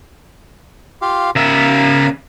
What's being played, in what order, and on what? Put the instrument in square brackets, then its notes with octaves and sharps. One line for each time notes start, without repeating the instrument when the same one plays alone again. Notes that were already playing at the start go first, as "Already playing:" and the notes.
[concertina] F4 G4 F5
[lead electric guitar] C#3 E5 [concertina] A#4 F5